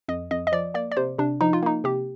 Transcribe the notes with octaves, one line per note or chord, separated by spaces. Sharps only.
F2 D#5
F2 D#5
D#5
F3 D5
A#3 D5
D5
C3 C5
C3 D4
F3 D#4
F4
A#3 D#4
C3 G4